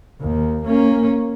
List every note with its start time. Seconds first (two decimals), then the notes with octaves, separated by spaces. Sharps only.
0.21 D#2
0.65 A#3 C#4